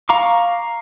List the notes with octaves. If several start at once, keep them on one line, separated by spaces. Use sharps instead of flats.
F5 A#5 C#6 D6